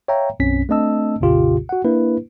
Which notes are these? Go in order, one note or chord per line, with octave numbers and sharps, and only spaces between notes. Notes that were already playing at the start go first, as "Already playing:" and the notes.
C#5 E5 F5 G5 A#5
B1 F#2 C4 C#4 B6
A3 C4 D4 D#5 A5 E6
B1 F2 A#2 C#3 F4 G4
F#4 F#5
A#3 D4 E4 B4